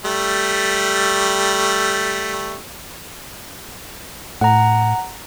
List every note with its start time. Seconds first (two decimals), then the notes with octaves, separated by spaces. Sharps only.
0.05 G3 A3
4.41 A2 F#5 A#5